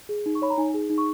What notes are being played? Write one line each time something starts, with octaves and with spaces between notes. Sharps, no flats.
G#4
D#4
C#6
C#5 B5
A#5
D#4 G#5
G#4
D#4
C#6